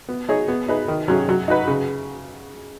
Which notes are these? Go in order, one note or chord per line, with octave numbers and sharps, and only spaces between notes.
B3
D#4 G#4 C#5
B3
D#4 G#4 B4
D#3
F#3 C#4 G#4
F#3
D#4 F#4 B4
C#3